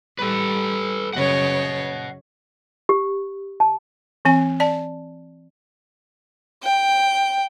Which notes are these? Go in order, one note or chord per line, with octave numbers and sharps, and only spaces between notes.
G3 A4 B4
F#2 C#3 C#5 D#5 F#5
G4
A5
E3 C4 G#5
D5 A5
G5